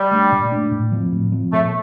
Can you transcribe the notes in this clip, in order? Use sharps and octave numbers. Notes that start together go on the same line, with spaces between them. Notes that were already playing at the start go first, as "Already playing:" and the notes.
Already playing: G3
A3 D4
A#2
A3 D4
A2
F3 C4
A2
F3 C4
A#2 A3